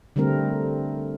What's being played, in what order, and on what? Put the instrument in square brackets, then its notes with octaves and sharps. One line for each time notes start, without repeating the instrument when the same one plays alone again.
[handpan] D3 G3 A3 C4 A#4